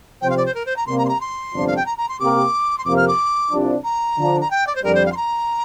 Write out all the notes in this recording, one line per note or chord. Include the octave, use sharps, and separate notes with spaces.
C3 F3 C4 G4 C5 G5
F5
D5
C5
A#4
C5
A#5
C3 G3 A#3 C6
A#5
C6
A#5
C6
G1 F2 C3 F3 D4
F5
G5
A#5
A#5
C6
C3 A#3 G4 A#4 D6
C6
F2 C3 A#3 D6
F6
D6
C2 C3 F3 D4
A#5
D3 F3 D4
A#5
G5
D5
C5
F2 D3 G3 A#4
C5
F5
C6
A#5